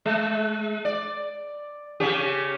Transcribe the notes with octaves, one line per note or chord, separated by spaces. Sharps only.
G#3
D5
C#3 C#4 G4